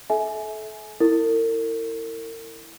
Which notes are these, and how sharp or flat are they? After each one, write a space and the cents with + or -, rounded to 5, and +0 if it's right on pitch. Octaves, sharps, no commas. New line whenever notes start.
A4 -30 E5 -20 G#5 +20
E4 +0 A#4 -40